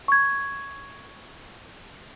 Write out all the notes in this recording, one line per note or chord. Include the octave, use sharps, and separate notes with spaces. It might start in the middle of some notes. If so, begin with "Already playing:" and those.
C#6 G#6